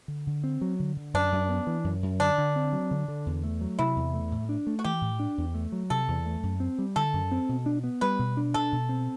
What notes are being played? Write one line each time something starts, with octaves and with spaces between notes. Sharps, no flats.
D3
D3
C4
F#3
D3
D3
F#2 D4
F#2
B3
E3
F#2
F#2
D3 D4
D3
C4
F#3
D3
D3
E2
A3
F#3
C3 E4
E2
A3
A2
D4
A3
F#4
E3 G4
A2
D4
E2
A3
F#3
C3 A4
E2
A3
F#2
C4
G3
D3 A4
F#2
C4
B2
D4
B3
G3 B4
B2
D4
B2 A4
B2
C4